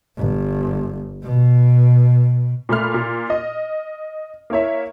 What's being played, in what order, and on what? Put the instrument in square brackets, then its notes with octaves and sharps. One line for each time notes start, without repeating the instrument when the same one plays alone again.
[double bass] G1
B2
[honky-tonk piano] A#2 A3 B5 F6
A#2
D#5
A#3 E4 C#5 E5